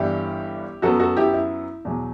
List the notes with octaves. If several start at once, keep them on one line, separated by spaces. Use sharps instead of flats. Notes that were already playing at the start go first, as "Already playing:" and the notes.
Already playing: G1 G2 E3 G3 E4 G4
F#2 F#3 B3 F#4 A4
F#4 A4
E4 G4
E4
E2 B2 F#3